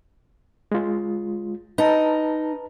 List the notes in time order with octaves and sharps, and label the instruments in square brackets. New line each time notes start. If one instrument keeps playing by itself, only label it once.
[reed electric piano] G#3 F4
[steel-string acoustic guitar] D#4 [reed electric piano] B4 A5 A#5